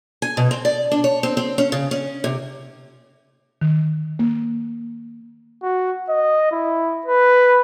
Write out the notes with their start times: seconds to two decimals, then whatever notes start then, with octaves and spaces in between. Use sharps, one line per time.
0.22 G#5
0.37 B2
0.51 C4
0.65 D5
0.91 D4
1.04 C#5
1.23 C4
1.37 C4
1.58 C#4
1.72 C#3
1.91 C#4
2.24 C3
3.61 D#3
4.19 A#3
5.63 F#4
6.09 D#5
6.52 E4
7.06 B4